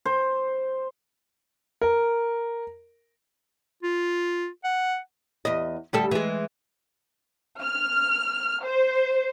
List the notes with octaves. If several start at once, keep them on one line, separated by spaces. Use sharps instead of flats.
C5
A#4
F4
F#5
E2 D#5
D2 G3 A4
E3 G#3
F6
C5